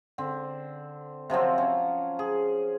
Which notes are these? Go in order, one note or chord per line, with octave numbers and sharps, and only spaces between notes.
D3 C4
C3 F3 F#3 C4
C#4
G#4